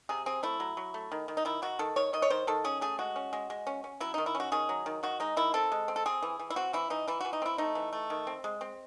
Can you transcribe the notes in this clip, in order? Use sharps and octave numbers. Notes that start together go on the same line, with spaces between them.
C3 G#4
C4 G#4
A3 E4
F#3
F#3
A3
D#3
D#3
D#4
D#3 E4
D#3 F#4
D#3 A4
D#3 C#5
D#3 D#5
C#5
D#3 C5
D#3 A4
C#4 G#4
A3 G#4
G#3 F#4
C#4
G#3
G#3
C#4
C#4
F#3 E4
D#3 D#4
E4
C#4
F#4
D#3 G#4
F#3
D#3
D#3 F#4
G#3 D#4
D#3 E4
C4 A4
G#3
C4
A4
C4 G#4
E3
E3
E4
C4 F#4
E3 E4
E3 D#4
E3 E4
E3 F#4
D#4
C4 E4
A3 D#4
E3
A3
D#3
C4
G#3
C4